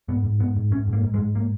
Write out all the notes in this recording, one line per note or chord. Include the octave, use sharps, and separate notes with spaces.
G#2 B3
G#2
G#2 B3
G#2
G#2 C#4
G#2
A#3
G#2
G#3
G#2
A#3